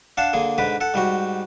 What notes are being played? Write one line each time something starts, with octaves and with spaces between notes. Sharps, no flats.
D4 F5 F#5 A5
D3 A#3 G#4
G#2 D3 B4 D6
A4 F#5
G#2 G3 F#4